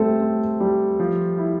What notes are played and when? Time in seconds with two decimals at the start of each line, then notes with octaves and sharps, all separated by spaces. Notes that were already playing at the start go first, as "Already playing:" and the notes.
Already playing: G3 A3 C4 A4
0.20 C4
0.60 G3
1.00 F3
1.38 E4